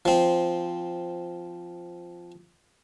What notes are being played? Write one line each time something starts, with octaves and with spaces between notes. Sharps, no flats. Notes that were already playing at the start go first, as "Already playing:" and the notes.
F3 C4